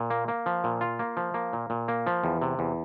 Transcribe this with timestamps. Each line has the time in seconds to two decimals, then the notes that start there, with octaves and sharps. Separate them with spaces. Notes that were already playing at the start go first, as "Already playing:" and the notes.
Already playing: A#2
0.10 A#3
0.28 A#3
0.46 F3
0.64 A#2
0.81 F4
0.99 A#3
1.17 F3
1.34 A#3
1.53 A#2
1.70 A#2
1.88 A#3
2.07 F3
2.24 E2
2.42 C3
2.59 E2